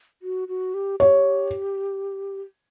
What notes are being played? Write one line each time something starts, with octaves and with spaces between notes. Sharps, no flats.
F#4
F#4
G4
G4 C#5